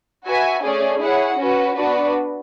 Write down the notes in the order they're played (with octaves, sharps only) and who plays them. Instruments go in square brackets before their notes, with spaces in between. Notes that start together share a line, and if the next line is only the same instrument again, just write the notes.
[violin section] F#4 B4 E5 G#5
A3 C#4 G#4 D5
E4 G#4 C#5 F#5
C#4 F#4 B4
B3 D4 F#4 B4 D5